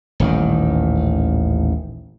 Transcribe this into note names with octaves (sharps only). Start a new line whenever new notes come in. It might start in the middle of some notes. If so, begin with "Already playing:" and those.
D#1 A1 D#3